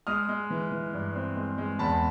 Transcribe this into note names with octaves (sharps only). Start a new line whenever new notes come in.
G#3 D#6 F6
G#3
E3
E3
G2
C4
G#3
G#3
E2 A5 B5